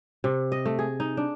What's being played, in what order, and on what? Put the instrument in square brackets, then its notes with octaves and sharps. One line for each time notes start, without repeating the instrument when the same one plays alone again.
[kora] C3
D#5
A3
G#4
D#4
D4